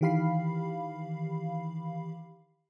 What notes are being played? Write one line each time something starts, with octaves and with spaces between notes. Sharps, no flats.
D#3 E3 G4 F5 B5 C7